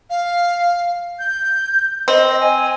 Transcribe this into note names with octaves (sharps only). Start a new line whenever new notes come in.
F5
G6
C4 D#5
G#5